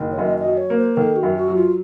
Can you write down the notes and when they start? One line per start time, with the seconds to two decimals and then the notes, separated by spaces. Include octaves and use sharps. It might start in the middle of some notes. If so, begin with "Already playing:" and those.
Already playing: F#1 D#3
0.12 C#5
0.18 F#2 D#5
0.39 D#5
0.45 F#3
0.57 C#5
0.70 A#3
0.77 C5
0.97 D#3 A4
1.16 F#4
1.23 F#2
1.35 F#4
1.48 F#3
1.55 F4